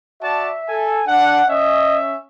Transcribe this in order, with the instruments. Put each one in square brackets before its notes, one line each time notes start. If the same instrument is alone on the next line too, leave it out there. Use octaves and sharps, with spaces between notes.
[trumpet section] F#4 D5 A5 [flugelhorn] E5
[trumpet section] A4 G#5
[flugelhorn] D4 [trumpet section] F#5
[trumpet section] C#4 E5 [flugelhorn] D#5